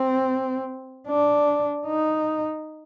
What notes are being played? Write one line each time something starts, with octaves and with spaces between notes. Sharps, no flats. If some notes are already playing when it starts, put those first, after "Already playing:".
Already playing: C4
D4
D#4